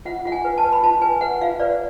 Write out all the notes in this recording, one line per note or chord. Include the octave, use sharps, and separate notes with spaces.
F4 F#5
F4 F#5
G#5
B4
A5
B4
B5
F4 A5
B4 G#5
B4 F#5
F4 F5
B4 D5